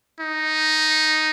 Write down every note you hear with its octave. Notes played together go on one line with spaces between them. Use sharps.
D#4